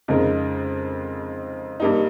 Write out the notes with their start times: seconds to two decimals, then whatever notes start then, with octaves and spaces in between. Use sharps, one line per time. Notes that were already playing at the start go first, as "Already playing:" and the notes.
0.08 F2 C#3 G#3 D#4 A#4
1.80 G2 G3 A#3 D#4